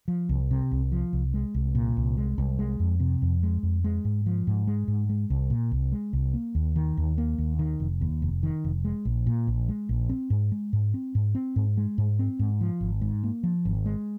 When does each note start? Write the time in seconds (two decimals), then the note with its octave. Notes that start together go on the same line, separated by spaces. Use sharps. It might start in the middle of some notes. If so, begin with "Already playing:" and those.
0.08 F3
0.29 C2
0.51 C3
0.72 C2
0.92 F3
1.13 C2
1.34 G#3
1.54 C2
1.75 A#2
1.97 C2
2.17 G#3
2.38 C2
2.59 G#3
2.80 F2
3.00 C3
3.22 F2
3.43 G#3
3.63 F2
3.84 G#3
4.05 G#2
4.26 F3
4.47 G#2
4.67 G#3
4.88 G#2
5.09 G#3
5.30 C2
5.50 A#2
5.71 C2
5.92 G#3
6.13 C2
6.34 A#3
6.55 D#2
6.76 D#3
6.97 D#2
7.18 A#3
7.38 D#2
7.59 D#3
7.80 F1
8.01 D#2
8.22 F1
8.43 D#3
8.64 F1
8.85 G#3
9.05 A#1
9.27 A#2
9.47 A#1
9.69 G#3
9.89 A#1
10.09 C4
10.30 G#2
10.52 G#3
10.73 G#2
10.94 C4
11.15 G#2
11.35 C4
11.56 G#2
11.77 G#3
11.98 G#2
12.19 C4
12.39 G#2
12.61 F3
12.81 G#1
13.01 G#2
13.23 A#3
13.43 F3
13.65 G#1
13.86 G#3